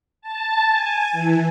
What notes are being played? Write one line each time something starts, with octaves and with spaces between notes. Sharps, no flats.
A5
G#5
E3